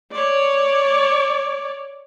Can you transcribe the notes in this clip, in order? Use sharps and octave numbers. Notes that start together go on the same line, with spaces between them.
C#5 D5